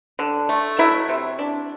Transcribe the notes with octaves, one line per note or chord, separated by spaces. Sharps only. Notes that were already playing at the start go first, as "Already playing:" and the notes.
D3
A3
F#3 E4 E5
C3
D4